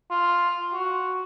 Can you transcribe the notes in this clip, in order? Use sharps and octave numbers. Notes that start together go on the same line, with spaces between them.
F4
F#4